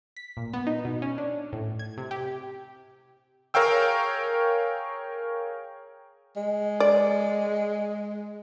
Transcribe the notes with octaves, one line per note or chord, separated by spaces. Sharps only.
B6
A#2
B3
D#4
B2
C#4
D4
A2
G#6
C3
G4
G#4 A#4 C#5 F5 G5 E6
G#3
D5